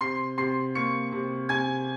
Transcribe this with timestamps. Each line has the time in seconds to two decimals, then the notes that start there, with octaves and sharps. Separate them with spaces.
0.01 C3 C6 C7
0.38 C3 C6 C7
0.75 A#3 C#6 C#7
1.12 C3
1.49 C3 G#5 G#6